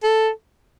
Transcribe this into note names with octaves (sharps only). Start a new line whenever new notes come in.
A4